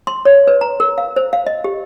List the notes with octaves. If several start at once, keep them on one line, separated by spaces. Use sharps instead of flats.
C6
C#5
B4
A#5
A#4
F5
C5
F5
D#5
G4